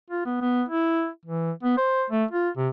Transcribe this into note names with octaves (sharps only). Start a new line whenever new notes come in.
F4
B3
B3
E4
E3
B3
C5
A3
F4
C3